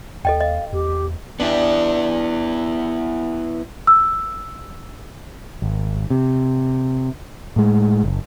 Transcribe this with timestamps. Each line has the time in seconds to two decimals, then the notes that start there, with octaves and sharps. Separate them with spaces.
0.25 D#2 A4 D#5 G5
0.40 D#5 F5
0.73 E2 G4
1.40 G3 B3 D4 E4
3.87 E6
5.62 G#1
6.10 C3
7.56 A2 G#3
8.04 F#1